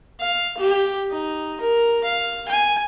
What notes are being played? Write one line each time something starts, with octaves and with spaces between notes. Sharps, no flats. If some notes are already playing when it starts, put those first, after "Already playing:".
F5
G4
D#4
A#4
F5
G#5